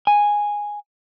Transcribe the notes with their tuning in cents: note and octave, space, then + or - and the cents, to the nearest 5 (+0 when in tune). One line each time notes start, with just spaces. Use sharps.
G#5 -5